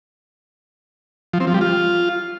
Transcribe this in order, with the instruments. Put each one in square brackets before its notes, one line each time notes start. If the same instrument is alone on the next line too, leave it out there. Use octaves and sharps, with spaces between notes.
[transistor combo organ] F3
C4
F3
G3
F4